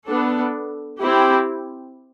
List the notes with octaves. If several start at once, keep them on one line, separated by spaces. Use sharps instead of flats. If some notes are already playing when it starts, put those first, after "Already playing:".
B3 D4 A4
C4 E4 G4